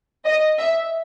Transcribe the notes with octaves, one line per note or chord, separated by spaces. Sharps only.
D#5
E5